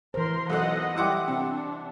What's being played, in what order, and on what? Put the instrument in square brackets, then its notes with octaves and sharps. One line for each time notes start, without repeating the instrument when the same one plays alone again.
[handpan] E3 C5 [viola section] A#4 C6
[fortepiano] B1 A4 F#6 [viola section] D#5 F#5
[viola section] G3 [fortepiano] E4 F#5 D6 [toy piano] G5 C6 E6
[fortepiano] C3 [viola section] D4 [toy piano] G5